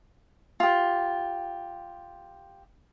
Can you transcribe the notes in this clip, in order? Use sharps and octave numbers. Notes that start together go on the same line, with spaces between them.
F4 G4